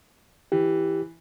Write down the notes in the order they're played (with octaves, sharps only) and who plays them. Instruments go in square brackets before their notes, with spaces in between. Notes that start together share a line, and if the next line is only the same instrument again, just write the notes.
[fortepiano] E3 [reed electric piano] G4